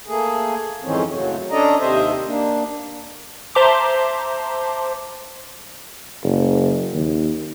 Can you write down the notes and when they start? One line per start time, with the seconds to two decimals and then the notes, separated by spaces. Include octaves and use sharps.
0.06 A3 A#3 G#4
0.83 F2 G#2 D#3 E3 C4 C#4
1.10 F#2 A2 C#3 F#3
1.51 C#4 D4 A4 D5 D#5 A#5
1.79 D#2 C3 C4 C5 D#5 E5
2.25 A#3 D4
3.55 C5 E5 A5 A#5 C6 D6
6.23 F#1
6.93 D#2